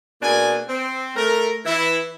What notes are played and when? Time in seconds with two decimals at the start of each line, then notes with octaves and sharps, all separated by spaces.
0.22 B2 A#3 D4 G#4 G#5
0.69 C4
1.16 A3 A#4
1.65 E3 E4